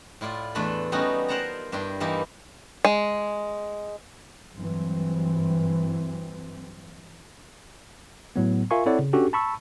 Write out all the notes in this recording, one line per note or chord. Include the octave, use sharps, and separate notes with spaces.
A2 E4 F4 D5
E2 A3 D4 A4 B4 B5
G3 A3 B3 C#4 D#4 F#4
F4 A#4 C5 F#5 A5 A#5
G2 D4 E4 G5 C6
E3 G3 A#3 D#4 E4
G#3
G2 E3 F#3 C4
A2 F#3 B3
F4 A#4 E5 F5 G#5 C#6
C4 E4 A4 C#5 D5 F#5
C#3
C#4 D4 F#4 G4 A4
A5 B5 C#6 E6